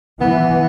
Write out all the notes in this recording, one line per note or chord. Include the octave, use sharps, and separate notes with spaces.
E3 B3